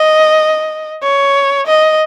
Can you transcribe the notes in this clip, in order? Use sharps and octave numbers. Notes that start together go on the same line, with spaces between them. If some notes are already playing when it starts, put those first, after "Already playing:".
Already playing: D#5
C#5
D#5